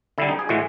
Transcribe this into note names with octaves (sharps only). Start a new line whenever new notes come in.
D3 G3 E4
D#4
G#4
A2 E3 G#3 F#4